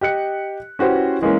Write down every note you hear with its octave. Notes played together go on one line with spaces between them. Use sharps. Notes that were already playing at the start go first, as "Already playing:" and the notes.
G4 D#5 F#6 C#7
C#4 E4 F#4 G4 B4 C5
E3 G#3 A#3 C#4